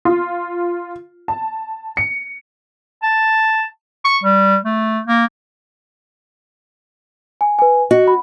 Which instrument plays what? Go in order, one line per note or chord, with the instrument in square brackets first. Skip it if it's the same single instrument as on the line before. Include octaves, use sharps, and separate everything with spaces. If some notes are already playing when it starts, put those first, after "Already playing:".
[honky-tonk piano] F4
A5
C#7
[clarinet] A5
C#6
G3
A3
A#3
[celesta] G#5
B4 G#5
[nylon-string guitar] F#4 [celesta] D#5
[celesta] B5